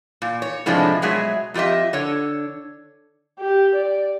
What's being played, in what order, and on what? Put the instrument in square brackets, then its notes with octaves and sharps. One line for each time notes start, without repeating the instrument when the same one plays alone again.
[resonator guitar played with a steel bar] A#2
C#5
A2 C3 F3 G#3 A3 D4
B2 F#3 G#3 G#4 E5
F2 F4 G4 D#5 E5
D3 C#5
[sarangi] G4
D5